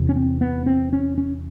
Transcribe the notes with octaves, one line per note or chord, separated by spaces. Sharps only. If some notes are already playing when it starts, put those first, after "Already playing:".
Already playing: E2 C3
C#4
C4
B3
C4
C#4
C#4